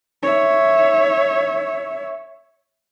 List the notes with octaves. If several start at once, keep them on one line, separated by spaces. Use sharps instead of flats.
C#5 E5